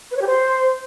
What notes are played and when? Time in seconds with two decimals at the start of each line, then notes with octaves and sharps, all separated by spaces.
0.11 B4
0.16 C#5
0.22 G4
0.27 C5